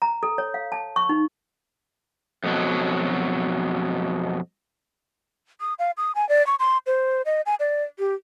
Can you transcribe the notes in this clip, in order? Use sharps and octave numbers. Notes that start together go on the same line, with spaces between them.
A#5
A4
C#5
F5
A5
C#6
D#4
F2 B2 F#3
D#6
F5
D#6
G#5
D5
C#6
C6
C5
D#5
G#5
D5
G4